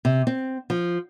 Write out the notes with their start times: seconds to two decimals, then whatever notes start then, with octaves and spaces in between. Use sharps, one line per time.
0.05 C3
0.27 C4
0.70 F3